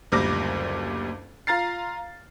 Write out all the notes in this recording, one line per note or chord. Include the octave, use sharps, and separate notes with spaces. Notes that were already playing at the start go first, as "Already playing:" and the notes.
F#1 D2 A#2 G3 D6 A#6
F4 F5 A#5 A6 C7